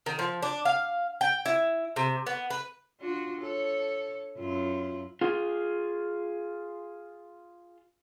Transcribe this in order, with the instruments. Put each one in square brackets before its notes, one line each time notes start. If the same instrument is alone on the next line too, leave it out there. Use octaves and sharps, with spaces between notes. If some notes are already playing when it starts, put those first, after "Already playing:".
[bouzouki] D#3
F3
D4
F5
G5
E4
C3
B3
B4
[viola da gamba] D4 F4 F#4
A4 C#5
F#2 E4 F4
[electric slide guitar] F4 G#4